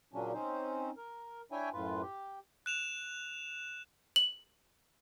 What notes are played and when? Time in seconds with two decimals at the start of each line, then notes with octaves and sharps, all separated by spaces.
0.13 A#2 C#3 F#3 C#4 D4
0.33 C4 C#4 D#4 C5
0.97 A#4
1.52 D4 E4 C#5 E5 G5 G#5
1.73 F#2 A2 F4 B4
2.02 G4
2.66 F#6 E7 F7
4.16 F#7